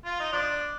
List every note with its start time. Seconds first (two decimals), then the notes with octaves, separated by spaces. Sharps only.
0.05 F4
0.19 D#4
0.32 F3 D4